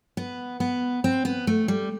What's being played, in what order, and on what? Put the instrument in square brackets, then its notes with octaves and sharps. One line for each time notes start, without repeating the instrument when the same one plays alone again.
[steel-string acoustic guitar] B3
B3
C4
B3
A3
G3